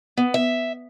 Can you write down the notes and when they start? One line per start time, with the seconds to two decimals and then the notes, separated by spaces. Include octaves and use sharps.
0.17 B3
0.34 E5